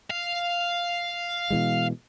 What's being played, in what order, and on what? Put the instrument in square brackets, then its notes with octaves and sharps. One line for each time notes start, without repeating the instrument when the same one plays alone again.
[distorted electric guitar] F5
[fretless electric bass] B2 E3 G#3